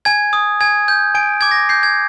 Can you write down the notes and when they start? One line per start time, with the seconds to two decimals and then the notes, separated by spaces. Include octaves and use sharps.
0.05 G#5 G#6
0.33 D#6
0.61 G#5 G#6
0.88 G6
1.15 G#5 D7
1.41 D6 G#6
1.51 A#6
1.69 G6 C7
1.83 G#6